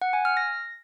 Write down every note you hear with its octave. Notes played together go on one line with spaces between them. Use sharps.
F#5
G#5
F6
A#6